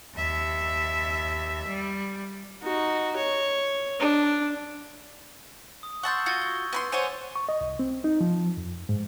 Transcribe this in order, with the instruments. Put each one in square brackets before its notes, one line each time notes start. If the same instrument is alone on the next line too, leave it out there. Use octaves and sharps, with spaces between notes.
[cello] D#2 E5
G3
[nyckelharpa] D#4 F#4
C#5
D4
[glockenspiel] D#6
[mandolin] F#5 A5 C6 [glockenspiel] C#6 E6 G6
[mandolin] F4 F#4 [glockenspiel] G#6 A6 G7
[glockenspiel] C#6 G7
[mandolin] B3 B5 C6
[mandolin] C5 C#5 F#5 [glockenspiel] G#5 D6 D#7
[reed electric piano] C#6
D#5
C2
C4
D#4
F3
F2
G#2